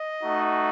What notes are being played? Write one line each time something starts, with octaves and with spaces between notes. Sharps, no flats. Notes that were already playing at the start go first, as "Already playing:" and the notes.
Already playing: D#5
A3 D#4 F#4